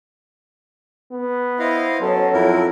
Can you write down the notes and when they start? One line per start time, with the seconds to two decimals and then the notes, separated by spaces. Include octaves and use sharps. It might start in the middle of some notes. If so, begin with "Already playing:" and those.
1.12 B3
1.59 E4 C5 D#5 F5
2.02 F#3 C#4 A4
2.33 F2 E4 A#4